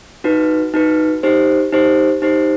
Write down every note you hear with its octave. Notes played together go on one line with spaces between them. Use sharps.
D#4 F#4 B4
D#4 F#4 B4
D#4 G4 C5
D#4 G4 C5
D#4 G4 C5